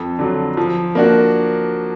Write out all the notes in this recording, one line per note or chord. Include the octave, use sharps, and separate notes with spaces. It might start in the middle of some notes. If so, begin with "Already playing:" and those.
Already playing: F2
D3 F#3
F3
A#3 D4 F#4